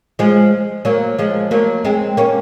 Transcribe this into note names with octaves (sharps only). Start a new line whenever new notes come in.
F3 G#3
F#3 A#3
F3 G#3
F#3 A#3
G#3 C4
A#3 C#4